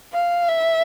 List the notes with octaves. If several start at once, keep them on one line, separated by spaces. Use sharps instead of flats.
F5
E5